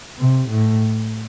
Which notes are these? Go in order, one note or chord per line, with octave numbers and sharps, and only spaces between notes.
C3
A2